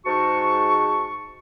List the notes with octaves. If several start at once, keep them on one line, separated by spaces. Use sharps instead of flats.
G#2 F#4 A5 C#6